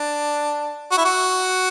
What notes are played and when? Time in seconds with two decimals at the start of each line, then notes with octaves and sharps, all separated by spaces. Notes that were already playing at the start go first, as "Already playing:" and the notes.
Already playing: D4
0.91 F#4
0.98 E4
1.05 F#4